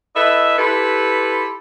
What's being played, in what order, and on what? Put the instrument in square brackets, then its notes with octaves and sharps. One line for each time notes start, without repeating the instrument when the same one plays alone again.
[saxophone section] E4 A4 B4 D#5 E5
E4 F4 G4 A4 B4